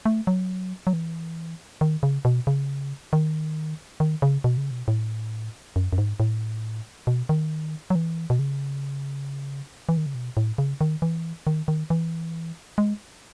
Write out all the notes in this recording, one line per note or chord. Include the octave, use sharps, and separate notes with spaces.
A3
F#3
F#3
E3
D#3
C#3
B2
C#3
D#3
D#3
C#3
B2
C#3
B2
A2
F#2
F#2
G#2
A2
B2
D#3
F#3
E3
B2
C#3
E3
D#3
C#3
B2
A2
C#3
D#3
E3
D#3
D#3
E3
G#3